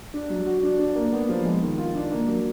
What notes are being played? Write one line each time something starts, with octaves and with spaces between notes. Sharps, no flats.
D4
F#3
F#4
D4
D4
A#3
B3
F3
G#3
D#3
F4
D4
A#3
F#3